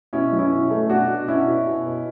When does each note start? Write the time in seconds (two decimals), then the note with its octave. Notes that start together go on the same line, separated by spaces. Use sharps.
0.13 B2 C#4 E4
0.32 F#3
0.39 C#4 E4
0.52 B2
0.71 A3
0.90 B2 D4 F#4
1.09 B2
1.28 B2 C#4 E4
1.48 B2
1.67 B2
1.86 B2